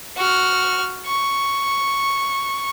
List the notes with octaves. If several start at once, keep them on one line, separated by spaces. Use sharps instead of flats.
F#4 F6
C#6